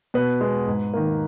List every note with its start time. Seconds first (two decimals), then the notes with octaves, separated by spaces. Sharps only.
0.14 B2 B4
0.41 G#3 B3
0.67 G#2
0.94 D#3 A#3